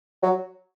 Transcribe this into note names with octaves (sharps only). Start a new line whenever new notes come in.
F#3